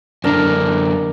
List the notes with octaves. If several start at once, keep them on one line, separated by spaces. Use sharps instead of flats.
F#2 D3 D4 A#4